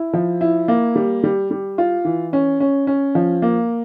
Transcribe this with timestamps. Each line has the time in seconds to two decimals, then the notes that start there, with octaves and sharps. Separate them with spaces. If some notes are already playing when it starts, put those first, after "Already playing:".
Already playing: E4
0.13 F3
0.41 E4
0.68 A#3
0.96 G3
1.24 G3
1.51 G3
1.78 F4
2.05 E3
2.33 C#4
2.60 C#4
2.87 C#4
3.15 F3
3.42 A#3